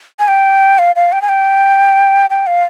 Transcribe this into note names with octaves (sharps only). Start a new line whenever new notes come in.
G#5
G5
F5
F5
G5
G#5
G5
G5
F5